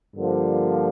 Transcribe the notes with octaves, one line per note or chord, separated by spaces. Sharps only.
G2 D3 F3 A#3